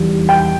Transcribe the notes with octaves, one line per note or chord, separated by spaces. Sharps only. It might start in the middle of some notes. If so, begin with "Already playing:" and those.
Already playing: E2 D#3 G3
G5